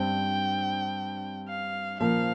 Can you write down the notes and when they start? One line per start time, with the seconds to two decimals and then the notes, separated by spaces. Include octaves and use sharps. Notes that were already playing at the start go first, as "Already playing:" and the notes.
Already playing: G2 G3 C4 G5
1.48 F5
2.00 A#2 F3 A#3 F5